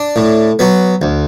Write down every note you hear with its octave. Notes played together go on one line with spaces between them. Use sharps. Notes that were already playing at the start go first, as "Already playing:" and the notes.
Already playing: D4
A2
F#3 B3
D2